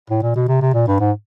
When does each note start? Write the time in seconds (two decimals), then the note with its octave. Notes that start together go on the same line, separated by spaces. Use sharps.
0.10 A2
0.22 A#2
0.36 B2
0.49 C3
0.62 C3
0.74 A#2
0.88 G2
1.00 G#2